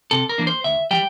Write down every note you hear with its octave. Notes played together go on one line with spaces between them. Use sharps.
C3 A4
A#4
E3 A#3 D4
C5
D2 E5
E3 G3 G5